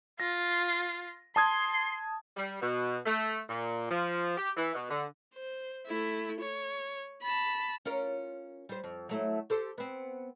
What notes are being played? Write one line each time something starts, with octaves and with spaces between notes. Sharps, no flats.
F4 A#6
A5 C6 D#6 G#6
G3
B2
A3
A#2
F3
G4
E3
B2
D3
C5
A3 E4
C#5
A5 B5
C#4 F4 A#4
G3 C5
F2
F#3 A3 E4
G4 A4 C5
B3 C4